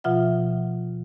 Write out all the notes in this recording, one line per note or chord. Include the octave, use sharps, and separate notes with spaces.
B2 F3 F4 E5 F#5